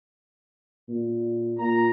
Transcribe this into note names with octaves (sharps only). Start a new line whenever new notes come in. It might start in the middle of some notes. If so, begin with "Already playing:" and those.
A#2
A#2 A#5